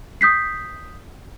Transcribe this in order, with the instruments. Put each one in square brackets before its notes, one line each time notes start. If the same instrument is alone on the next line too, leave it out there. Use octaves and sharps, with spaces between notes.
[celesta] D#6 G6 B6 C7